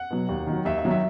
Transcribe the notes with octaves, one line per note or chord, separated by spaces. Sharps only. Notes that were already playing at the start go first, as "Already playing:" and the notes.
Already playing: F#5
B2 F#3
D#2
D#3 F#3
D#2 E5
E5
D#3 F#3
E5